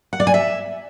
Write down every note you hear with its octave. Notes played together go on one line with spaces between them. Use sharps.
F#5
D5
G#5
E5